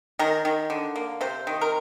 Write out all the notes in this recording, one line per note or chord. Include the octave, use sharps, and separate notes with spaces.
D#3 A#4
D#3
D3
A#3
C3 C5
D#3
A#4